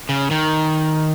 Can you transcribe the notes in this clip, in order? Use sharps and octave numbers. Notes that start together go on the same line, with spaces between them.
C#3
D#3